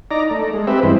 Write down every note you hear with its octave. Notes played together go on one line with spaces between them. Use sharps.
D#4 D5 A#5
A3
G#3
C4 G4 B4 E5
G2 E3 G#3 C4